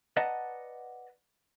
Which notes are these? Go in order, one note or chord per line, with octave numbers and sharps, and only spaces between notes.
B4 D5 D#5 F#5 A5 A#5